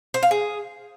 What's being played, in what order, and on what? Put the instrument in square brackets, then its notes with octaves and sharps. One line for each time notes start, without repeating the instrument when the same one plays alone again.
[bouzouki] C5
F5
G#4